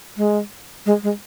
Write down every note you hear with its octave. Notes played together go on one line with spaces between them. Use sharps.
G#3
G#3
G#3